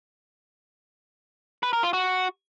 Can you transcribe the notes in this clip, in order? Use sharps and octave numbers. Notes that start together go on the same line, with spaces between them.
B4
A#4
F4
F#4